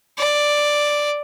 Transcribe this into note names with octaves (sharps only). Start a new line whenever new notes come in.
D5